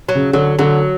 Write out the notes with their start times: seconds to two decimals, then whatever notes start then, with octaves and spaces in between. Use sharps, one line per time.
0.09 F#3
0.15 C#3
0.33 D3 F#3
0.59 D3 F#3